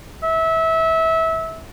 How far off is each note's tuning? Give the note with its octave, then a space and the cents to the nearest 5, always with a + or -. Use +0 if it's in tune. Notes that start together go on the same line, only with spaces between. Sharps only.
E5 -25